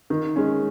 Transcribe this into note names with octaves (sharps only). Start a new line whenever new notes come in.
D#3
G#3 C#4